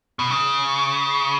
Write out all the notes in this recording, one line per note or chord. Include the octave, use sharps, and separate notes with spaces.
B2
C#3